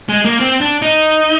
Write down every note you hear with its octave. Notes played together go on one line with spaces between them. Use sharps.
G#3
A#3
C4
D4
D#4